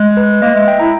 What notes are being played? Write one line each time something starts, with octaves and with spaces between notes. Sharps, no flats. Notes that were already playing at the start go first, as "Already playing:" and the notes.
Already playing: G#3
B4
A#3 D#5
G#3 E5
G5
E4 A#5